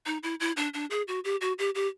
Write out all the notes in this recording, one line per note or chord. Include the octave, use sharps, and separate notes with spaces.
D#4
E4
E4
D4
D4
G#4
F#4
G4
F#4
G4
G4